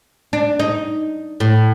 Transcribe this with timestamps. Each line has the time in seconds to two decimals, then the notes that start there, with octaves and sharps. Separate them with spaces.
0.33 D4
0.60 D#4
1.40 A2